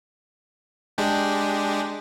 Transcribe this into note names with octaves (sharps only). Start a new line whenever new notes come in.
G#3 D4 G4